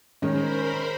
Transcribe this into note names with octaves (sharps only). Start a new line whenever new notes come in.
D#3 G#3 C#4 A#4 C5 B5